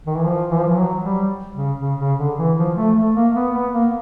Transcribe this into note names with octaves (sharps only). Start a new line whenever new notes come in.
D#3
E3
F3
E3
F3
E3
F#3
G3
C#3
C#3
C#3
D3
E3
F3
A3
A3
A#3
B3
B3
A#3